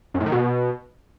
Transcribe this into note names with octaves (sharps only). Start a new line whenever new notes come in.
F#2
A2
D#3
B2